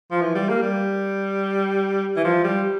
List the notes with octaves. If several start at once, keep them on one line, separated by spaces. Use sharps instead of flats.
F3
E3
G3
A#3
G3
E3
F3
G3